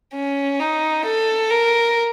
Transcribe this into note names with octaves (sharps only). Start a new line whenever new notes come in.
C#4
D#4
A4
A#4